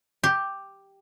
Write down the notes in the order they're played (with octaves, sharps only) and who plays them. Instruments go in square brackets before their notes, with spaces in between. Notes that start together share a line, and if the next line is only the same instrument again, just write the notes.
[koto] G4